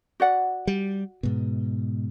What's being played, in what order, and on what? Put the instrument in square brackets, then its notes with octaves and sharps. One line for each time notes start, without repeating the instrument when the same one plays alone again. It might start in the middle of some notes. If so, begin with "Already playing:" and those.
[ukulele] F#4 D5 F#5
[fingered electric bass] G3
G#2 B2